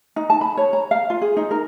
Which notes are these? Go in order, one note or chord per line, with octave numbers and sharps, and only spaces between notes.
D#4
A5
B5
C#5
A#5
F5
F4
G#4
D#4
A#4